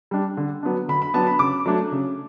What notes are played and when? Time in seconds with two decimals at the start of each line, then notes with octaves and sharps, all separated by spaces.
0.11 G3 D4
0.37 D3
0.63 F#3 B3 D4
0.88 D3 B5
1.02 B5
1.14 F#3 B3 D4 A5
1.27 B5
1.39 C#3 D6
1.66 F#3 A3 D4
1.92 C#3